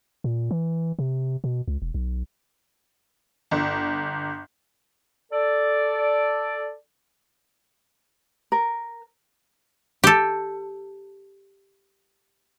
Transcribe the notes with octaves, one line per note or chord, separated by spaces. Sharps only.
A#2
E3
C3
B2
C#2
E1
B1
G1
A4 D5
A#4
G4 A4